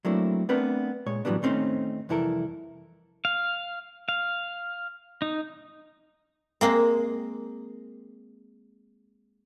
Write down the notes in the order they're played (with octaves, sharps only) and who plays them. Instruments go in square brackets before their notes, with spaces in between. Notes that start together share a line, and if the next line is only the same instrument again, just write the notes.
[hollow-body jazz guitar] F#3 A3 A#3 C4 D4 E4
A3 B3 C4 D4 A#4 B4
A#2 G#3 C#5
A2 E3 F#3 G3 B3 D4
D#2 A3 C4 C#4 D#4 C5
C2 F2 E3 E4 A4 A#4
[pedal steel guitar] F5
F5
D#4
[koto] G#3 A#3 C4